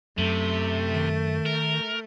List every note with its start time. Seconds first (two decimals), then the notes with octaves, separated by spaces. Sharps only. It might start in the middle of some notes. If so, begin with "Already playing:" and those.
0.18 F#2 C3 A3
0.94 D#3
1.46 A#4